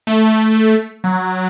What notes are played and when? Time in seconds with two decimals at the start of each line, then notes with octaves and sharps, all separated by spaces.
0.07 A3
1.04 F#3